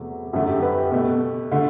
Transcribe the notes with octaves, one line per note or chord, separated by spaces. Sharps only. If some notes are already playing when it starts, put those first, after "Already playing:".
Already playing: E2 C3 F#3 A3
F#2 D3 F#3 A3 F#4
G4
B4
G4
B2 A3
D3 A3